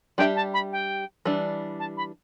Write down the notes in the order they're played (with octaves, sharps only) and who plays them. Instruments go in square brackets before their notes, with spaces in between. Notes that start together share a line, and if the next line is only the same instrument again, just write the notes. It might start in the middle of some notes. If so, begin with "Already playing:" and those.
[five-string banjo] G3 D4 G4 E5 [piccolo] G5
[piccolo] A5
B5
G5
[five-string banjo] E3 G3 D4
[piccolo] A5
B5